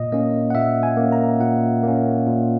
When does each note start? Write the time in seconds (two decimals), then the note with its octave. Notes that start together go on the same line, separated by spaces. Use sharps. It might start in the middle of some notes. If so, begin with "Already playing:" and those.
Already playing: A#2 D#5
0.12 A#3 C#4 D#5
0.50 F#5
0.55 A#2 E5
0.83 G#5
0.97 A#3 C#4
1.12 A#5
1.40 A#2 F#5
1.83 A#3 C#4
2.26 A#2